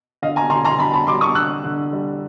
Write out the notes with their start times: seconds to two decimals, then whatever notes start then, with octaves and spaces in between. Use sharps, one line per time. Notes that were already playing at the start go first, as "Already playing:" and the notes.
0.22 D3 D#5 F5
0.36 G#5 A#5
0.50 D3 A#5 C6
0.65 A#5 C6
0.78 D3 A5 B5
0.93 A5 B5
1.07 G3 C6 D6
1.21 C#6 D#6
1.35 D3 E6 F#6
1.64 D3
1.93 G3